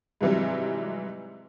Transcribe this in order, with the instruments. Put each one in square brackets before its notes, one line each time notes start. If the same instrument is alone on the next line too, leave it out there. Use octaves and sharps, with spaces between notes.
[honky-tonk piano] G#2 C3 E3 F#3 G3